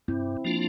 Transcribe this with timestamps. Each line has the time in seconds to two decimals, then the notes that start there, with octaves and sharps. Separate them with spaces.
0.08 G2 C4 E4
0.45 F3 A#3 D4 F4